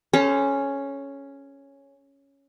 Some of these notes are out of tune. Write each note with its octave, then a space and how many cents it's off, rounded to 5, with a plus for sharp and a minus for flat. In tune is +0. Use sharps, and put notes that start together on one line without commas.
C#4 +0 A4 -35 C5 -25